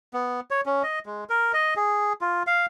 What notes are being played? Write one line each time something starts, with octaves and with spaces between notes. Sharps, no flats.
B3
C#5
C#4
D#5
G#3
A#4
D#5
G#4
F4
F5